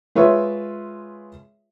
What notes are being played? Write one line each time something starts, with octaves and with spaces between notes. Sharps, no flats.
G#3 F4 B4 C#5 E5